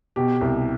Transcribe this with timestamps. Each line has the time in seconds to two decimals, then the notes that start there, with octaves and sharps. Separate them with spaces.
0.16 B2 G4
0.41 C2